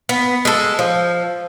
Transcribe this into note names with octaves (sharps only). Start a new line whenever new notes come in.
B3
G#3 A4
F3